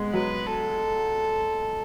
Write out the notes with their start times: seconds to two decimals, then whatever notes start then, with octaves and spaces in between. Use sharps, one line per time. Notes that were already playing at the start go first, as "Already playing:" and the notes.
Already playing: G#3 B3
0.13 F#3 B4
0.47 A4